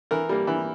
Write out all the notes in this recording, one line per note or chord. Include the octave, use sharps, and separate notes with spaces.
E3 A#4
G3 A#3
E3